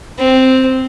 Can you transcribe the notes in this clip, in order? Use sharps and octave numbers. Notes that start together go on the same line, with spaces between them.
C4